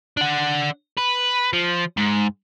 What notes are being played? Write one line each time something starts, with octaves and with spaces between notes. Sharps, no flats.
D4 F#5
B4
F3
G#2